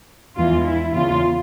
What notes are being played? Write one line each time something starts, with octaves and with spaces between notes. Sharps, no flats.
E2 E3 G#3 F4
E4
E2 C#3 E3 F4